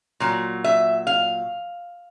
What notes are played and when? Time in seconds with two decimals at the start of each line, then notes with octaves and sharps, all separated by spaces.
0.20 A#2 F#3
0.64 E5
1.07 F5